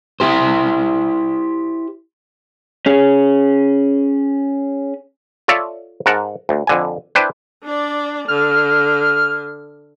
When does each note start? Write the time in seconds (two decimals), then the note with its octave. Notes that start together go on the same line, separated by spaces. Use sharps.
0.20 E4 G4 C5
2.86 C#4 G#4
5.48 F4 A4 C#5 D5 E5 F5
6.06 G#2 A#4 F#5 A5
6.49 D2
6.67 F2 D3 G#5
7.15 D4 E4 B4 C5 G5
7.63 D4 D5
8.28 D3 F6